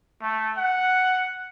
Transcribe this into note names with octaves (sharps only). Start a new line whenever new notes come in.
A3
F#5